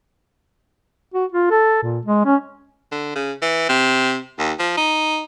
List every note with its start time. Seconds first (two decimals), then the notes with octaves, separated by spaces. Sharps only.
1.14 F#4
1.32 F4
1.51 A4
1.83 A#2
2.06 G#3
2.25 C#4
2.92 D3
3.16 C#3
3.42 E3
3.69 C3
4.38 D#2
4.59 F3
4.78 D#4